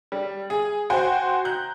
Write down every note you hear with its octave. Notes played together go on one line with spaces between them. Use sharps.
G3
G#4
F#4 C5 G5 G#5
A#5 F#6 G6